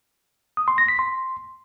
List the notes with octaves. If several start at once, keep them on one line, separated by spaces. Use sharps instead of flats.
D#6
C6
A#6
B6
C6